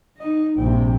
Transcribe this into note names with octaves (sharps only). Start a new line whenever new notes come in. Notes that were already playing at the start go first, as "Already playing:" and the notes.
D#4 D#5
A#1 G2 C3 A#3 G5